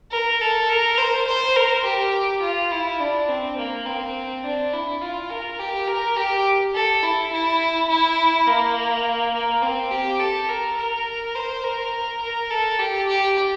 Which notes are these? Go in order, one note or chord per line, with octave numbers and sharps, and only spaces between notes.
A#4
A4
A#4
C5
C5
A#4
G4
F4
E4
D4
C4
A#3
C4
D4
E4
F4
A#4
G4
A#4
G4
A4
E4
E4
E4
A#3
A#3
C4
G4
A4
A#4
A#4
C5
A#4
A#4
A4
G4
G4